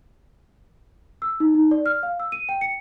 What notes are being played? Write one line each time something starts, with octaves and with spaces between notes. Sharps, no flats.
E6
D#4
D#4
D5
F6
F5
E6
D#7
G5
C#7